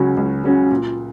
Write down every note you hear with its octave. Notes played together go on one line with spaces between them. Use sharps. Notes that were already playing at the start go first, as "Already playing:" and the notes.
Already playing: C#2 C#3 F#3 C#4 F#4
C#2
C#3 F#3 C#4 F#4
A#2